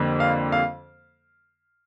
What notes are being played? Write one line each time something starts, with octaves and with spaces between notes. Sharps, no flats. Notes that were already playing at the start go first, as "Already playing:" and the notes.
Already playing: F2 D3 G3 A#3
F5
F5